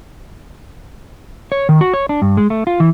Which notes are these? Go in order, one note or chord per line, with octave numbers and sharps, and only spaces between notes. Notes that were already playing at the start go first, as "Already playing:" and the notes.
C#5
D#3
F#4
C#5
D4
G2
G#3
A3
F4
E3